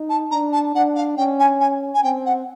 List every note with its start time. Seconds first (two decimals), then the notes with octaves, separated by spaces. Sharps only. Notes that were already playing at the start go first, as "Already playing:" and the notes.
Already playing: D#4
0.09 A5
0.31 D4 A#5
0.53 A5
0.75 D4 F#5
0.95 F5
1.17 C#4 G5
1.39 G#5
1.60 G#5
1.94 G#5
2.03 C4 G5
2.25 F#5